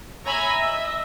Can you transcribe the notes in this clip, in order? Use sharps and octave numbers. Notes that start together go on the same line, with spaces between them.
C#5 E5 G#5 A#5 B5
D#5 E5